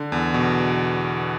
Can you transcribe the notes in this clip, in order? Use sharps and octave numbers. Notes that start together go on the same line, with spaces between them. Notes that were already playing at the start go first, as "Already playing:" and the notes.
Already playing: D3
E2
B2